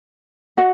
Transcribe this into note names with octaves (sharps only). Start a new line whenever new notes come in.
F#4 D#5 F#5